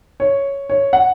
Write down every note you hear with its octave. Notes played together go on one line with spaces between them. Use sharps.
C#5
C#5
F#5